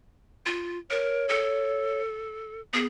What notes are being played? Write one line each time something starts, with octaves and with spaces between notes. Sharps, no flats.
F4
A#4 C#5
A4
B3 G#4